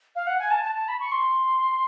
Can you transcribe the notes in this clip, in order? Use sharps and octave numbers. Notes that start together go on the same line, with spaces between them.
F5
F#5
G#5
A5
A5
A5
B5
C#6
C6